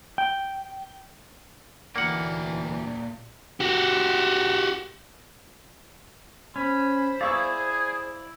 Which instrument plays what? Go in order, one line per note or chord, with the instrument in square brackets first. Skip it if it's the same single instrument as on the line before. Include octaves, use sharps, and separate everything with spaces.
[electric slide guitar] G5
[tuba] D2 [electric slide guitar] A#2 D5 G5 [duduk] E3 [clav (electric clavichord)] A#3 F#5
[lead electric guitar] F#4 G4
[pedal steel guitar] C#4 [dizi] C5 [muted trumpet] B5
[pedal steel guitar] E4 D5 [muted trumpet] G#4 [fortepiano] F5 C#6 E6